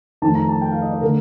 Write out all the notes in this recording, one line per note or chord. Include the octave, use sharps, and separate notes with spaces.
F2 D#3 A3 A5
A#5
A5
G5
F5
D#5
D5
D3 A3 A#4